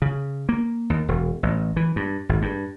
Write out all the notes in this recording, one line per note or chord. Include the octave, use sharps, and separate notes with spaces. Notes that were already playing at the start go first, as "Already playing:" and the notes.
C#3
A#3
D#2
E1
A1
E3
G2
G#1
G2